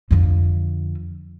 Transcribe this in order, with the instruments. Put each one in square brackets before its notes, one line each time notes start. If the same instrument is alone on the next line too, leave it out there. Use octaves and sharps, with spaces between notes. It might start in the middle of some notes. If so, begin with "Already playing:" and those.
[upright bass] F2 D3